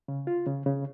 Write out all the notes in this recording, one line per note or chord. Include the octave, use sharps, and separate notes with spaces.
C#3
F4
C#3
C#3